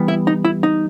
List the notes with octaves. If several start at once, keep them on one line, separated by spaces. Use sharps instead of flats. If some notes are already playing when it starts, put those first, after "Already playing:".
Already playing: E3 G3 B3
E4
D#4
E4
D#4